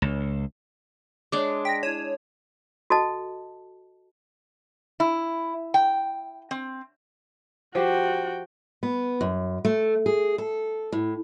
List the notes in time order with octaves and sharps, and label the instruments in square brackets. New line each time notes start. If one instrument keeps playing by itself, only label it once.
[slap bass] C#2
[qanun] G#3 D4 [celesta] C#5 D5 D6
[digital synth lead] G5 [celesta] A#6 B6
[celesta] E4 D#7 E7 [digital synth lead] C#5
[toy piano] F#4 A4 D#5 A5
[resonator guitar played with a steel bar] E4
G5
C4
[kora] F3 G4 C5 [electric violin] F#4 G5
[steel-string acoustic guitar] B3
F#2
A3
G#4
A4
A2